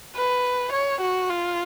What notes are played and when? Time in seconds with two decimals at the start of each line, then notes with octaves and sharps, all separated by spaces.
0.16 B4
0.73 C#5
1.01 F#4
1.29 F4